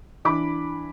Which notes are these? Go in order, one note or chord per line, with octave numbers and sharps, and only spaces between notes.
E3 D4 B5 D6